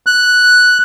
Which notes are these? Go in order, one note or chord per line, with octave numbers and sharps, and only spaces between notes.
F#6